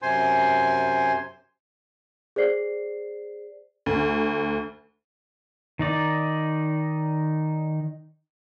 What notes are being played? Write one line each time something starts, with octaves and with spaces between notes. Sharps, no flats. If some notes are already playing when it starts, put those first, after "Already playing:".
F#2 C3 C5 G#5 C6
G#4 C5 D5 C7
D2
D#3 D#4 D5